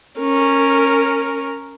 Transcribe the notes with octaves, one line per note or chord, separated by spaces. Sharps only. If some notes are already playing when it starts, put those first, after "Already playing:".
C#4 A#4